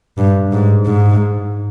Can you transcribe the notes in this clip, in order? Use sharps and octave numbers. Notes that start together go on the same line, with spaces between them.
G2
G#2
G#2